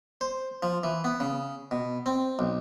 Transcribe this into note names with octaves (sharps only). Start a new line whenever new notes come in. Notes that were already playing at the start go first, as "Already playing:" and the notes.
C5
F3
E3
B3
C#3
B2
C4
B1